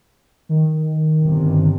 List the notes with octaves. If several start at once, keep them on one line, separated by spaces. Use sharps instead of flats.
D#3
G1 G2 C3